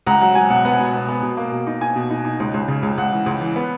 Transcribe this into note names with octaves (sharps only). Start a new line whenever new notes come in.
C#2 F#5 A#5
F#3 F#5
F#3 G#5
B2 F#5
B3 F#5
B2
B3
B3
B2
A#3
B2
D#4
D#4 G#5
B2
D#4
D#4
C#2
C#2
C#3
C#2
C#2 F#5
E3
C#2
E3
B3